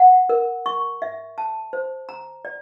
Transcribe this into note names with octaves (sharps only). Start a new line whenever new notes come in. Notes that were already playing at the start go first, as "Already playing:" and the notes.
Already playing: F#5
A#4
C#6
E5
A5
C5
A#5
D5